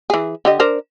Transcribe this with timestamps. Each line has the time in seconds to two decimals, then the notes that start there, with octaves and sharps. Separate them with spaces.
0.10 E3 G#4
0.45 D3 G4 D#5
0.60 D4 A#4 C5